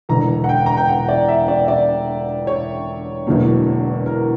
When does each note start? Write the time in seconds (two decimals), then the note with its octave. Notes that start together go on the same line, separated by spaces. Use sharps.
0.09 E1 E2 D3 A#5
0.44 F#5
0.49 G5
0.66 A#5
0.77 G5
0.89 F#5
1.09 D5
1.28 E5
1.48 D5
1.68 D5
2.47 C#5
3.27 E1 E2 D3 F#3 A#3
4.06 A#4